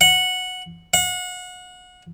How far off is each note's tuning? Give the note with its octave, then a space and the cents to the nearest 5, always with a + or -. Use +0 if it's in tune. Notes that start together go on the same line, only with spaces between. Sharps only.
F#5 -10
F#5 -30